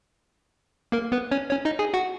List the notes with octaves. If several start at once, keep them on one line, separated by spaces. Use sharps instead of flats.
A#3 A#4
B3 B4
C#4 C#5
C#4 C#5
D#4 D#5
G#4 G#5
F#4 F#5